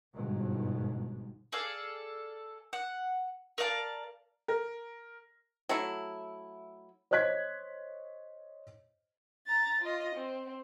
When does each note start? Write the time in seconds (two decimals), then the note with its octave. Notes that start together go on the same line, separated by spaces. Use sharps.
0.14 G1 G#2 B2
1.52 G#4 A4 D5 F5
2.73 F#5
3.58 A#4 D5 F5 A5
4.48 A#4
5.69 F#3 A3 E4
7.11 C5 C#5 D#5 F#6 G#6 B6
9.47 A#5 A6
9.81 F4 D#5
10.15 C4